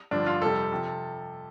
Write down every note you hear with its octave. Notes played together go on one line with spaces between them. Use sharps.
G2 D3 F3 D4
F4
F2 C3 G3 A4
C3 F3